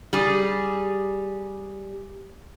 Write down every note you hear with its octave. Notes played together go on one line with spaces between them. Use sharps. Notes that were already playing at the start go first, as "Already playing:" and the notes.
G3 G#4